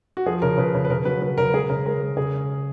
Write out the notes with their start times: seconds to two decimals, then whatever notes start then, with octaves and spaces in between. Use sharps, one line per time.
0.17 F#4
0.26 F3 G#4
0.42 C#3 A#4
0.58 C#3 B4
0.75 C#3
0.85 B4
0.90 C#3 A#4
1.05 F#3 B4
1.22 F#3 B4
1.38 C#3 A#4
1.53 G#3 G#4
1.69 C#3 A#4
1.86 G#3 A#4
2.01 G#3
2.17 C#3 G#4